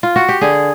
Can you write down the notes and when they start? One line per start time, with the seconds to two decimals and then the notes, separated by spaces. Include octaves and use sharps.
0.03 F4
0.16 F#4
0.29 G4
0.41 D3 G#4